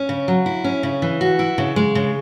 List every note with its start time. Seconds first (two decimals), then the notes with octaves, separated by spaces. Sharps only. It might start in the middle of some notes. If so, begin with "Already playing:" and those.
Already playing: C#4
0.09 C#3
0.28 F#3
0.46 E4
0.64 C#4
0.83 C#3
1.02 E3
1.21 F#4
1.39 E4
1.58 C#3
1.76 G#3
1.95 C#3